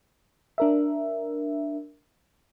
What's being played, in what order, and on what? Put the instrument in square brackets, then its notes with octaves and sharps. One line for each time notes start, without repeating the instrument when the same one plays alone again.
[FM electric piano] D4 A#4 E5